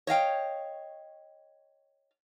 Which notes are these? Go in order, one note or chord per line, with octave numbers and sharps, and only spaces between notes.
C#5 D#5 F5 G5